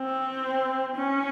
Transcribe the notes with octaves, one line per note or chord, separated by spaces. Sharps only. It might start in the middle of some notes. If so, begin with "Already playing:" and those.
Already playing: C4
C#4